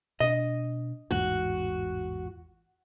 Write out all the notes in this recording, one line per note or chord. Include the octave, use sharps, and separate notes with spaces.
B2 D4 D#5
A1 E2 G#2 F#4